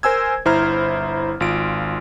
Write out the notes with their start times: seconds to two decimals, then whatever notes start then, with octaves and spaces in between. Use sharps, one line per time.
0.03 A#4 C5 G#5 E6 G#6
0.45 G1 E4 C5 A#5 F6
1.40 G#1 F4 D7